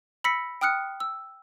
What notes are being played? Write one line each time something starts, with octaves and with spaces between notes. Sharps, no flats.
B5 E6 A#6 B6 C#7
G5 D#6 F6 F#6 C#7
E6